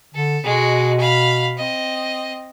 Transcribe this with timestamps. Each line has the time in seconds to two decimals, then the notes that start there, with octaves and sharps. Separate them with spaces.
0.14 D3 A4
0.44 B2 G#3 F#4
0.99 F5 B5
1.56 C4 D#5